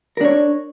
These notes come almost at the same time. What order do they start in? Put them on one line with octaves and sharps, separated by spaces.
A#4 D4 C#5